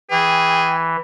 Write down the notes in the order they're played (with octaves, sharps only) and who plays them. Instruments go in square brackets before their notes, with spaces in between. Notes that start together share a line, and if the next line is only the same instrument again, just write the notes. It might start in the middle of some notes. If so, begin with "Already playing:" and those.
[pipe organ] E3 [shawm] G#4 [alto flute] G5